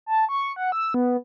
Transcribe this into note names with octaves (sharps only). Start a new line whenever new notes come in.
A5
C#6
F#5
E6
B3